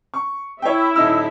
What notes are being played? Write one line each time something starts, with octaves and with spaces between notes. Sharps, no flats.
C#6
E4 C#5 E5 G5
D#1 D#4 E6